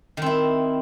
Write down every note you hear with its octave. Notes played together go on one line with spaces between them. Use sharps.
D#3 C4 E4